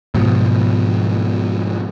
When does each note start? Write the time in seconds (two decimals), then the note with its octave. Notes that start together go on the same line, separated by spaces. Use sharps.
0.14 G#2 B2 F3